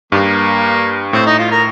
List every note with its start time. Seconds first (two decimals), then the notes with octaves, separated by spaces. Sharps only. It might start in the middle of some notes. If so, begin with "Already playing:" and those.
0.12 G2 D#3 G3 A#3
1.13 A2 C4
1.26 D#4
1.39 F4
1.51 A#4